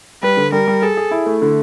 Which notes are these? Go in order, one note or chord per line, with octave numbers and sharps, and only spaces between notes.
G3 B4
D3
G3 A#4
G3
G#4 A4
G#4
E4
A3
D3